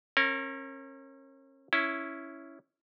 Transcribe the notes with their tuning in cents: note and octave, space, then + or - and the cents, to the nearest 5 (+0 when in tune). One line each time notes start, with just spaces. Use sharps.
C#4 -35 A#4 -15
C#4 +0 E4 +0